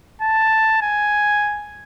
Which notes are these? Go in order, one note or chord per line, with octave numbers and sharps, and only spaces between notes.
A5
G#5